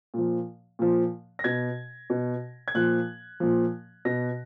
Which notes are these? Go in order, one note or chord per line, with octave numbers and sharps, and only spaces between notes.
A#2 F3
A#2 F3
A#6
B2 G#6
B2
G#6
A#2 F3 F#6
A#2 F3
B2 A#6